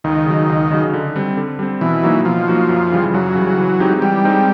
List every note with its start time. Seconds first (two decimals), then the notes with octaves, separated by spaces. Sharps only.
0.04 C#2 D#3
0.26 C#3 F#3
0.49 C#2
0.71 C#3 F#3
0.93 D3
1.16 G3 C4
1.37 D3
1.59 G3 C4
1.81 B2 E3
2.03 F#3 A#3 D#4 F#4
2.25 B2 F3
2.48 F#3 A#3 D#4 F#4
2.69 F#2
2.92 C#3 E3 G3
3.13 F#2 F#3
3.35 C#3 E3 G3
3.57 E3
3.80 G#3 C4 D#4 G4
4.01 E3 G3
4.24 G#3 C4 D#4 G4